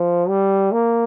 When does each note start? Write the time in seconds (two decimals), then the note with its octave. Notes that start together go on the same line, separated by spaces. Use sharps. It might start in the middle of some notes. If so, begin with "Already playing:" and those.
Already playing: F3
0.28 G3
0.72 A#3